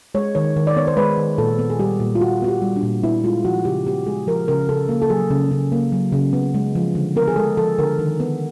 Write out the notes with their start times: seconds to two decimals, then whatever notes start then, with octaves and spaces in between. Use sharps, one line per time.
0.15 G#3 C#5
0.35 D#3 C#5
0.56 D#3
0.67 D5
0.76 B3 C#5
0.87 C5
0.97 G#3 B4
1.17 D#3
1.38 A#2 A4
1.59 B3
1.70 G#4
1.79 G3 G4
2.00 A#2
2.15 F4
2.21 A#2 F#4
2.42 B3 F#4
2.48 G4
2.62 G3
2.76 D4
2.83 A#2
3.03 B3 E4
3.24 G#3 F4
3.44 F3 F#4
3.65 C#3 G4
3.86 B3 G4
4.06 G#3 G#4
4.27 F3 A#4
4.48 C#3 A#4
4.69 C#3 A4
4.89 A#3
5.02 A4
5.10 F#3 G#4
5.31 C#3
5.51 C#3
5.72 A#3
5.92 F#3
6.12 C#3
6.33 B3
6.54 G#3
6.75 F3
6.95 D3
7.16 B3 A#4
7.27 G#4
7.36 G#3 A4
7.57 F3 A4
7.79 D3 A#4
7.99 D#3
8.20 B3